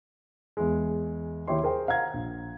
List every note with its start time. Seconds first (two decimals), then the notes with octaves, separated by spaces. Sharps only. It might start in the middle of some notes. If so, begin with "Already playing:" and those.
0.57 E2 G#3
1.47 D#2 E4 G4 C#5 C6
1.63 G#4 A#4 C5 G5
1.88 F5 F#5 A#5 G#6
2.14 A#1